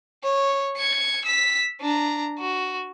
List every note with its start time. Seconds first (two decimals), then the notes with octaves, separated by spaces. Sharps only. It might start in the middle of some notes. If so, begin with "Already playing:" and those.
0.23 C#5
0.77 G#6 C#7
1.25 E6 B6
1.81 D4 A#5
2.40 F#4